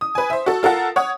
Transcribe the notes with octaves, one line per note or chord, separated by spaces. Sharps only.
D#6
B4 G#5
C5 E5
F#4 A4
F4 A4 A#4 F#5
C#5 F#5 D#6